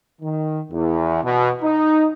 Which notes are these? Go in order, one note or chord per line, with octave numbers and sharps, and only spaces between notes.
D#3
E2
B2
D#4